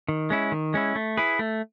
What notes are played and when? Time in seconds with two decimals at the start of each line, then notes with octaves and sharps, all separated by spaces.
0.08 D#3
0.30 G#3 C#4 E4
0.52 D#3
0.74 G#3 C#4 E4
0.96 A3
1.17 E4 G#4 B4
1.39 A3